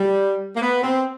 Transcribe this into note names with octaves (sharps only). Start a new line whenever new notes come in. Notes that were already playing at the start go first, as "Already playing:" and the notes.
Already playing: G3
A#3
B3
C4